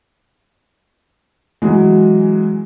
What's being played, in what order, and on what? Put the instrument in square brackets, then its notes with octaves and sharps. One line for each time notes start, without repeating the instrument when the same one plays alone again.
[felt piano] E3 F#3 G#3